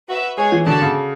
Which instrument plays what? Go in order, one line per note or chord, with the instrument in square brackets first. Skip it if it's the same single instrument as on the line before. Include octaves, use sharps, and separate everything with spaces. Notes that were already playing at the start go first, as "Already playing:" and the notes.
[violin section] F#4 B4 E5
[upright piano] G#3 [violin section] G#4 C#5 G#5
[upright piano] E3
[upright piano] D3 [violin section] F#4 A4 D5 A5
[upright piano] C#3